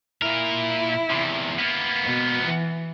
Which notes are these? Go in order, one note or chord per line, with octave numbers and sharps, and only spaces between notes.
A#2 E4 A#4
E2 C3
A#3 B3
B2
E3